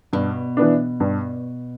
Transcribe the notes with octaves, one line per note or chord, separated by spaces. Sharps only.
G2 B2
E3 B3 D4
G2